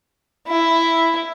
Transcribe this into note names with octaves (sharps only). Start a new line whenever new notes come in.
E4